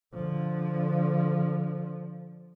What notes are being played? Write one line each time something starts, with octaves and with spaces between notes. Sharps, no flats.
D3 F3